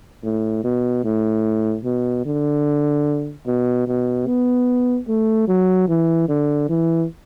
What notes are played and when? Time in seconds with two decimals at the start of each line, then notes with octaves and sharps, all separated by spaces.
0.23 A2
0.64 B2
1.04 A2
1.84 B2
2.25 D3
3.47 B2
3.87 B2
4.27 B3
5.08 A3
5.48 F#3
5.88 E3
6.29 D3
6.69 E3